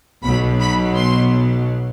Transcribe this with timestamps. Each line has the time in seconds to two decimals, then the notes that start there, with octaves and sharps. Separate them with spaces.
0.23 B1 B2 F#3 B5
0.60 B5
0.96 C6